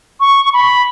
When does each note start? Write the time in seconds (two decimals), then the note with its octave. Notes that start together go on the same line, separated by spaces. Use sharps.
0.20 C#6
0.53 B5